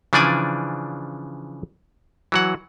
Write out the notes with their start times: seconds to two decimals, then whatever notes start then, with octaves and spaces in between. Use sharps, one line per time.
0.13 C#3 E3 F3 D4 D5 G#5
2.32 E3 F#3 F#5